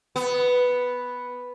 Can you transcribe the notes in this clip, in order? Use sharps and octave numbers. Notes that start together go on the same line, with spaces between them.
B3